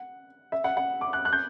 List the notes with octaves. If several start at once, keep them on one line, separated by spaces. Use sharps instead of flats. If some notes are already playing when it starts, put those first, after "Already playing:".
Already playing: F#5
E5
F#5
F#5
D6
F#6
F#6
G6